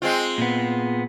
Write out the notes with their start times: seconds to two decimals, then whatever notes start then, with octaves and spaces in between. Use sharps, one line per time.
0.02 G#3 C4 F4
0.38 A#2 B3